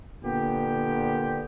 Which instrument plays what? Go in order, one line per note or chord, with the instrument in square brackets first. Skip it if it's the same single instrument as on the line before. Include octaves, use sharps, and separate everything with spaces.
[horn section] A#2 D3 B3 G4 G5